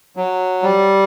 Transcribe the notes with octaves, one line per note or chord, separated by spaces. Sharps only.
F#3
G3